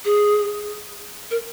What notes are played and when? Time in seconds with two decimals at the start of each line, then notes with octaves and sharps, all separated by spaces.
0.05 G#4
1.31 A#4